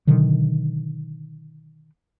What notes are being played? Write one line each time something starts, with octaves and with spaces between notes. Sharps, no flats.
B2 D3 D#3 F#3